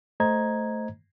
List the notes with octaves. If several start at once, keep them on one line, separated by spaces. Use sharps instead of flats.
A3 C5 D#5 A#5 G#6